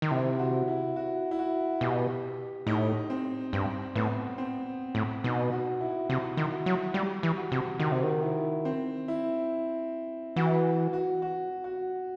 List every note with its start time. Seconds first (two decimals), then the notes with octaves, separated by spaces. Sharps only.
0.02 D#3
0.10 C3 E4
0.39 F#4
0.68 E4
0.96 F#4
1.31 E4
1.39 F#4
1.81 B2 G4
2.67 A2 D#4
3.10 C4
3.53 G2 C4
3.95 A2 B3
4.38 C4
4.95 A2
5.24 B2 D#4
5.52 F#4
5.81 E4
6.09 C3 E4
6.37 D#3
6.52 F#4
6.66 F#3
6.94 G3 G4
7.23 E3
7.37 F#4
7.52 C3
7.79 D#3 F#4
7.92 C3
8.03 D#3
8.23 E4
8.65 C4
9.08 E4
10.36 E3 F#4
10.93 F#4
11.22 F#4
11.64 F#4